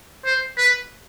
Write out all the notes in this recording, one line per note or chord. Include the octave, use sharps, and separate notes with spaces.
C5
B4